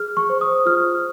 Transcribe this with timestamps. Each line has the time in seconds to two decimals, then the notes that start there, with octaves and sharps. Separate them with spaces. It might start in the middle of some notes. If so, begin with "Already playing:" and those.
Already playing: G#4 F6
0.17 C#6
0.30 C5
0.41 D#6
0.66 F4 F6